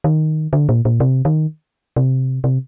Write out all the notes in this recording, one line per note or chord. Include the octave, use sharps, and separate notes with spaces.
D#3
D3
A#2
A#2
C3
D#3
C3
C3